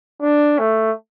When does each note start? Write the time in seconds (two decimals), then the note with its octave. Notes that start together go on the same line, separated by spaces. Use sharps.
0.21 D4
0.59 A3